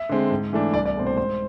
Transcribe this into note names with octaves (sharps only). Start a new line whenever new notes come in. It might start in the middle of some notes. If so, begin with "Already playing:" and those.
Already playing: E5
D3 G#3 C4
G#2
E3 A3 D4
C2 D5
D5
B2 A3 C4
C5
G#2 C5